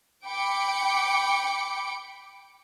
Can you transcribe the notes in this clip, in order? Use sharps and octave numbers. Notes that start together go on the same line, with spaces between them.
G5 B5 D6 C#7 D7